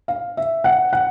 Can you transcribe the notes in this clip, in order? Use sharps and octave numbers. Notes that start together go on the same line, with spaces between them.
F5
E5
F#5
F#5